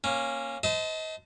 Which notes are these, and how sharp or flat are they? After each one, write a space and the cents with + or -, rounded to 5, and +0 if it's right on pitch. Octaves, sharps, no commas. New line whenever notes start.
A#3 +0 C#4 -15
C5 -30 D#5 +30 A5 +0